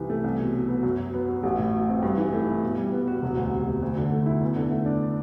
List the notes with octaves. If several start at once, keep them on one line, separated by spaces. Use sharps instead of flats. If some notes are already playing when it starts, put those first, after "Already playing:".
Already playing: C2 C3 E3
A3
C2
B2
F#3
B3
F#2
F#3
B3
F#4
A1
A2
F#3
C4
G2
E3
A3
E4
B2
G3
B3
F#4
E1
D2
C3
E1
D2
D3
A3
E4
E2
D3
A3
D4